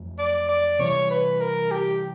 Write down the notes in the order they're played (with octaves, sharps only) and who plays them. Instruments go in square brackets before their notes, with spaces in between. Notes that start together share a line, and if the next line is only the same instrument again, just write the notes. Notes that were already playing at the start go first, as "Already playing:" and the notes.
Already playing: [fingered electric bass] F2 F#3 A3
[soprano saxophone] D5
D5
[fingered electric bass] C3 E3 G3 [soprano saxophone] C#5
[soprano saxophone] B4
A#4
G4